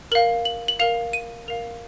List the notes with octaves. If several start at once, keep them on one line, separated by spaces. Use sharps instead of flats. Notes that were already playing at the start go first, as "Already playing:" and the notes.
A#4 F5 F#7
F#7
F#7
A#4 F5 F7
D#7
A#4 F5 F7